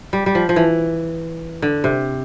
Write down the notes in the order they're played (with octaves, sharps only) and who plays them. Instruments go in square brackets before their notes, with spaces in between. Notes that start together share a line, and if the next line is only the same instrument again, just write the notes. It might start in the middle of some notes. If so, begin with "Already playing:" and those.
[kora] G3
G3
F3
F3
E3
D3
C3